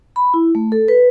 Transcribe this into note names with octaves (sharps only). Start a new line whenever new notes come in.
B5
E4
A3
A4
B4